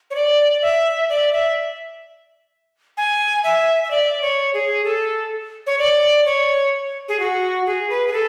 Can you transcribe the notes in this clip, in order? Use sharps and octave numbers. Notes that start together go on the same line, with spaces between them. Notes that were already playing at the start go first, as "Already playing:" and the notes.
C#5
D5
E5
D5
E5
G#5
E5
E5
D5
C#5
G#4
A4
C#5
D5
C#5
G#4
F#4
G#4
B4
G#4
A4